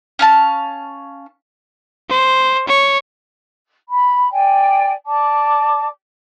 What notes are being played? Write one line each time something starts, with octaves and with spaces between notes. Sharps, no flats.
C#4 F5 A5
C5
C#5
B5
D5 G5 G#5
D5 A5 D6